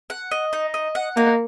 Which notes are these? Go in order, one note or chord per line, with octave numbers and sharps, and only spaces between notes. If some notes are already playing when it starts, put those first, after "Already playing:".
F#5
D#5
D#4
D#5
F#5
A#3 D#4